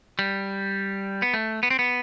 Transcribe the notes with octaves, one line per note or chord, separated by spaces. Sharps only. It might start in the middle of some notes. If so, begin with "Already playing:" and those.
G3
B3
A3
B3
C4
B3